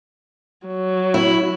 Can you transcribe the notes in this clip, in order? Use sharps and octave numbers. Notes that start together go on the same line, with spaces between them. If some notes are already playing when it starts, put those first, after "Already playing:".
F#3
E4